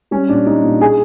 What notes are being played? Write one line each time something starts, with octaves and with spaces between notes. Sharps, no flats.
G3 C#4
A#2 D4
G3 D#4
A#2
G#4